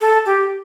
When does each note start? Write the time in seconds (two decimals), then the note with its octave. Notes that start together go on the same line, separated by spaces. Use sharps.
0.01 A4
0.26 G4